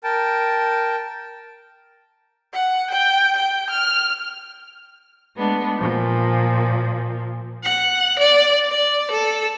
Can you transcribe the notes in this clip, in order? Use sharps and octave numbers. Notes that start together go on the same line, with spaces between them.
A#4 G5 A5
F#5
G5
G5
F6
G#3 A3 B3 D4
A#2 F3
F#5
D5
D5
A4